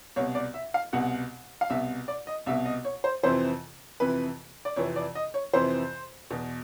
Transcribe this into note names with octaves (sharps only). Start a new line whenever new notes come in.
C2 B2 C#5
D5
E5
F5
C2 B2 F#5
F5
C2 B2 E5
D5
D#5
C2 B2 E5
D#5
C#5
C5
F2 C3 E3 C5
F2 C3 E3 B4
D5
F2 C3 E3 C#5
D5
D#5
C#5
F2 C3 E3 C5
E2 B2